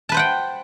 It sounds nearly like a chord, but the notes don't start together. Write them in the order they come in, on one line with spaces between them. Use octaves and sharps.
A5 B4 C5 F#5 G5